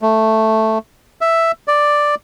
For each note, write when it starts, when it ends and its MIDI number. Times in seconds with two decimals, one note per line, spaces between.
0.02 0.78 57
1.21 1.52 76
1.68 2.15 74